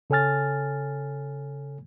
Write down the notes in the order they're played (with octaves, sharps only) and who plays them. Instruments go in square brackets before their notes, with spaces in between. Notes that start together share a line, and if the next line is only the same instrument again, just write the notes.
[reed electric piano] C#3 A4 C#5 G#5 F6 A6